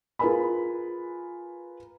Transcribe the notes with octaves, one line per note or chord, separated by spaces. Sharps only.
F4 G#4 A#4 B4 G#5 B5